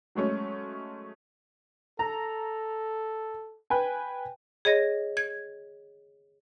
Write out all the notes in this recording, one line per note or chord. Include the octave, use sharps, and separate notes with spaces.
F#3 G#3 A3 C#4
A4 A#5
B4 G5 G#5
G#4 C#5 D#5 A#6
G#6